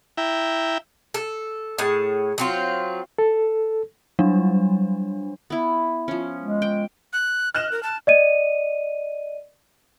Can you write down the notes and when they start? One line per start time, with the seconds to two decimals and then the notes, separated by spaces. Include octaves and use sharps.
0.17 E4 E5 G5 A#5
1.14 A4
1.78 A2 G#4 A5
2.38 F#3 C4 F4
3.18 A4
4.19 F#3 G3 D4
5.50 B3 E4
6.08 F3 C#4
6.43 G#3
6.62 G5
7.13 F#6
7.54 D#5 F6 F#6 E7
7.72 A#4
7.83 A5
8.07 D5 D#5 D#7